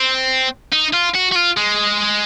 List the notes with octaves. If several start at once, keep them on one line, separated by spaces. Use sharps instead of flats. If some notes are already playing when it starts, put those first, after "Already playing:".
Already playing: C4
D#4
F4
F#4
F#4
F4
G#3